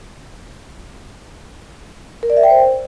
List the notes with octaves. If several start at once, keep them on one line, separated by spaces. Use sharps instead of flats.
A#4
D5
E5
G5
C5